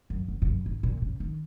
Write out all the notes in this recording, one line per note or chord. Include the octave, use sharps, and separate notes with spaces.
F#2
F#2
G#2
F#2
G#2
A#2
C#3
D#3